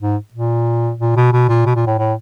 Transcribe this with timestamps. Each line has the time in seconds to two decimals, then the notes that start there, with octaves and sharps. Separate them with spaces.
0.01 G#2
0.34 A#2
1.00 A#2
1.16 B2
1.33 B2
1.49 A#2
1.66 B2
1.76 A#2
1.87 A2
1.99 A2